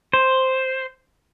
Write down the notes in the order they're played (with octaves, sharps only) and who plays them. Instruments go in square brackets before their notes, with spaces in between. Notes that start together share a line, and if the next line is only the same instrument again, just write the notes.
[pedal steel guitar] C5